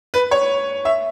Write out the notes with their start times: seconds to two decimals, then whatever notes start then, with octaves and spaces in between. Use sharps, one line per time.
0.14 B4
0.31 C#5
0.85 E5